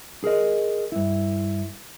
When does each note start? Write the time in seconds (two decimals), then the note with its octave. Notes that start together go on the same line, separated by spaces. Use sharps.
0.24 G#4 A#4 D#5
0.92 G2 E4